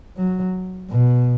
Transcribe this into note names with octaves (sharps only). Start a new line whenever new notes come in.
F#3
B2